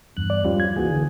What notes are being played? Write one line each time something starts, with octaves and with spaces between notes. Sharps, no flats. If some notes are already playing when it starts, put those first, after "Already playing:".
E2 G2 F#6
D5
F3 G3 C#4 F4
G#6
C#2 E3 A#3 F#4 G#4
D3